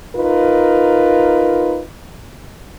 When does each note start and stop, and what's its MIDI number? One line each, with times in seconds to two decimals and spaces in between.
0.15 1.81 63
0.15 1.81 65
0.15 1.81 70
0.15 1.81 71